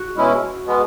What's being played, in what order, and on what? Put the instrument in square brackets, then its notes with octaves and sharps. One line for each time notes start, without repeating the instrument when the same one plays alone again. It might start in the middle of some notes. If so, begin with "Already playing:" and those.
Already playing: [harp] F#4
[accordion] B2 G#3 C#4 E4
B2 G#3 B3